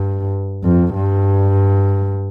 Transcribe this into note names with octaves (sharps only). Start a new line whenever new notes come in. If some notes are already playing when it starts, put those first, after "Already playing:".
Already playing: G2
F2
G2